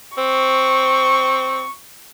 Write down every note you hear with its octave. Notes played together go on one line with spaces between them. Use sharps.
C4 C#6